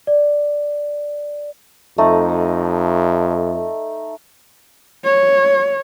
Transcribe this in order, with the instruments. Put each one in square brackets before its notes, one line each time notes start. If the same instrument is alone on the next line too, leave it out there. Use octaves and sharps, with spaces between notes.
[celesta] D5
[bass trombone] F2 [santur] A3 D#4
[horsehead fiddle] C#5